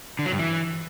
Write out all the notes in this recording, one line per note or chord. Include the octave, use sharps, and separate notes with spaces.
D3
F#3
G2
E3